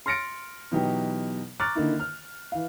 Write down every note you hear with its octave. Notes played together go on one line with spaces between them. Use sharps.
C6 F6 A6 A#6 C#7 D7
B2 E3 F#3 D#4 G4
A#5 C#6 D6 F6 F#6 A6
D3 D#3 A#3 D#4 E4
F6
E3 F5